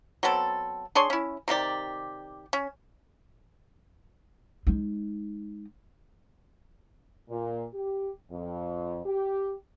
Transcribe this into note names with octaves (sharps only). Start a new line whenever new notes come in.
F#3 B3 C4 A4
D4 G#4 C#5 C6
C#4 E4
C3 D#3 G4 D5
C#4
G#3 D#4
A#2
G4
F2
G4